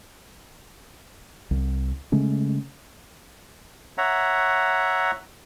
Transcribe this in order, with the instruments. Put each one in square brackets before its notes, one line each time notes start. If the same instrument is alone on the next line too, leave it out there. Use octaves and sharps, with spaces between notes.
[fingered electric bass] C2
C#3 G#3 A3 C#4
[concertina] C#5 E5 F#5 A#5